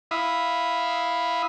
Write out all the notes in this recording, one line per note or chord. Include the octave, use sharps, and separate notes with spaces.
E4 E5 F5 D#6